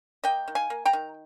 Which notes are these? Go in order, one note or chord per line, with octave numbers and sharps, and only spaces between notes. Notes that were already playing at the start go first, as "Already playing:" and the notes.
A#3 D#5 G5
D#3
F5 G#5
A#3
G5 A#5
D#3